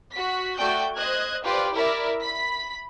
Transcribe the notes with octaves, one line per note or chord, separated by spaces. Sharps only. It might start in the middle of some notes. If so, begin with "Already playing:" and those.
F#4 B6
A3 F#4 D5 G5 G6
C5 D#5 F#6 G#6
F4 G4 B4 C5 D5
E4 A#4 D5 E5
B5 B6